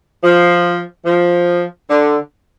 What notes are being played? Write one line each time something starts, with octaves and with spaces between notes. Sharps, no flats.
F3
F3
D3